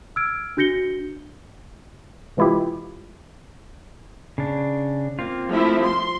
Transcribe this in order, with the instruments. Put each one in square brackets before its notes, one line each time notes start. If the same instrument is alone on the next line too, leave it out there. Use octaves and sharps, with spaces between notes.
[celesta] E6 F6 G#6 D7
D4 F#4 G6 A#6 C#7 G7
[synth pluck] C3 E3 G#3 E4 F4 G4
[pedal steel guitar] C#3 D4
A#3 C4 F4
[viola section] F3 A3 E4
C6